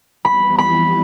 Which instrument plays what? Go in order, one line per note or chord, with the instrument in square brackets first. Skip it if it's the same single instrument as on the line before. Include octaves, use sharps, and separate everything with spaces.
[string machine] F2 E3 G3 B3 [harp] B5
[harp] B5